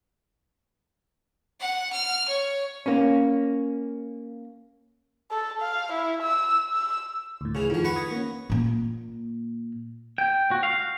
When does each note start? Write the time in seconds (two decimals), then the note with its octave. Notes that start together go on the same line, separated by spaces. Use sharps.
1.60 F#5
1.93 F6
2.28 C#5
2.86 A#3 C#4
5.31 A4
5.61 F5
5.92 E4
6.22 E6
6.73 E6
7.41 D2 A2
7.55 C#3 E3 G#4 C#6
7.70 F2 D#3 F3
7.84 B4 F#5 C#6
7.96 D#6 G#6 A#6
8.11 A#3 C#4
8.50 A#2 A#3
10.18 G5
10.51 F#4
10.63 F5